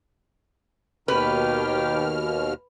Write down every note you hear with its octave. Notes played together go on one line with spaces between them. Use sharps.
D#2 B2 D#3 G4 B4 F6